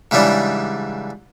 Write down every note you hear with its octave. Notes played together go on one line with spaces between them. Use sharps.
G#2 C#3 E3 G3 D4